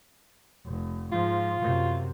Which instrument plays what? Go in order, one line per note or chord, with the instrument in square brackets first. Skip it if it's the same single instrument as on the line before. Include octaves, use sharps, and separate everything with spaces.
[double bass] F1
[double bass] G#2 F3 [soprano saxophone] F4
[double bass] F#2 C3